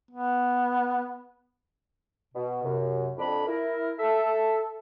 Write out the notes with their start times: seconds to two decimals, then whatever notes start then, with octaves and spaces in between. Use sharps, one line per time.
0.11 B3
2.34 B2
2.64 F#2 C3
3.17 F2 D4 B5
3.46 E4 A#4
4.00 A4 E5